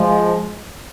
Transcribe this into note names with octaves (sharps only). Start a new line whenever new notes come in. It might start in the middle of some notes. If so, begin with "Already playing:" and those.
Already playing: F3 G#3